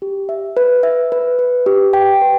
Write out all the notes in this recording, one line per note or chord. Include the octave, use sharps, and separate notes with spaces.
G4
E5
B4
E5
B4
B4
G4
G5
B4